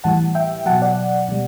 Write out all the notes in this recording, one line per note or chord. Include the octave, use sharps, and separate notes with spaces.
A2 E3 G3 F#5 A5
E5 G5
B2 F#3 F#5 A5
D5 F#5
B2 G3